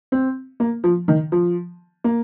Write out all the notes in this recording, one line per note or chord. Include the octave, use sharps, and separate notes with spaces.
C4
A#3
F3
D#3
F3
A#3